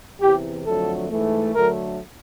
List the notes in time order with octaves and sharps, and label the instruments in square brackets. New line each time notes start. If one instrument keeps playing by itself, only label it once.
[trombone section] E2 C3 E3 G4
F2 D3 F#3 A3 A4
G#2 E3 A3
D2 D3 F#3 A3 A#4